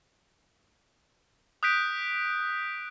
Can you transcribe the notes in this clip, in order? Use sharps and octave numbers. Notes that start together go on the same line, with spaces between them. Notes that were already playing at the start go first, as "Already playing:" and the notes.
D#6 F#6 G6 B6 D7